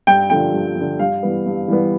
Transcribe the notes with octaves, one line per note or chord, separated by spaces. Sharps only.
G2 G5
D3 F3 G5
G2
D3 F3
G2 F5
E3 G3 B3
G2
E3 G3 B3